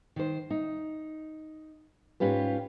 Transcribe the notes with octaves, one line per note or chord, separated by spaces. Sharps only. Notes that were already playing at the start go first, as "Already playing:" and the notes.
D#3 C5
D#4
G#2 C#4 F4 G4 B4